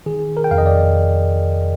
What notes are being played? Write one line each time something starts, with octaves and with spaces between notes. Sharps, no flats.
D#3 G#4
A#4
G5
F2 F5
D#5
D5